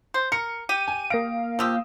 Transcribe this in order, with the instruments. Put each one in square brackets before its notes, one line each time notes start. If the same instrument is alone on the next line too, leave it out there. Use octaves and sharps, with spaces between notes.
[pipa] C5
[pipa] A#4 [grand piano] C#7
[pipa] G4 [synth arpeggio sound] D#7
[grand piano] G#5
[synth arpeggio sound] A#3 F5 [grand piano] D#6 A#6 D7
[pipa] F3 F4 G4 [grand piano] D#6 E6